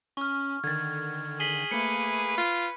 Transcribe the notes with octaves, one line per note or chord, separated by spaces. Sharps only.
C#4 C#6 F6
D3 D#3 G#6 A6
G#4 B6 F#7 G7
A3 A#3 B4 C#7
F4